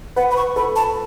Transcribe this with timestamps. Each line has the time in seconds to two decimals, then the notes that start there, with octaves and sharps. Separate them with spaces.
0.16 B4 F#5
0.31 B5
0.36 C#6
0.56 A4 B5
0.76 A5